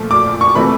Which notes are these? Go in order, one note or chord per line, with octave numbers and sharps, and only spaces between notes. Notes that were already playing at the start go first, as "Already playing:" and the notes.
Already playing: A#2 F3 A3
D6
C#6
C3 E3 A3 B5